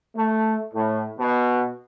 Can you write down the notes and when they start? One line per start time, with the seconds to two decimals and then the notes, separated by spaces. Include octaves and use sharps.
0.15 A3
0.73 A2
1.18 B2